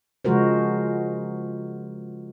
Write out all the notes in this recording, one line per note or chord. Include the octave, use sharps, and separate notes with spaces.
C#3 F3 G#3 F#4 A#4 C5